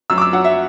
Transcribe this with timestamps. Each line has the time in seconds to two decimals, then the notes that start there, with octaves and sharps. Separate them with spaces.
0.10 F#2 E6
0.18 D6
0.22 E6
0.33 F#3 F#5
0.45 E5